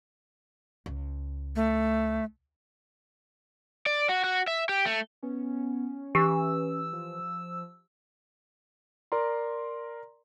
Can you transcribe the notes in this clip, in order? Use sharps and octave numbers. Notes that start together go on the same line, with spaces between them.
C#2
A3
D5
F#4
F#4
E5
G4
A3
B3 C#4
E3 G4 E6
F3
A#4 D5 A#5 C6